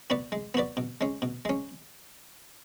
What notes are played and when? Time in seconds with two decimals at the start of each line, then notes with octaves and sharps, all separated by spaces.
0.10 B3 F#4 B4 D5
0.32 G#3
0.54 B3 F#4 B4 D5
0.77 B2
1.01 G#3 C#4
1.22 B2
1.45 G#3 C#4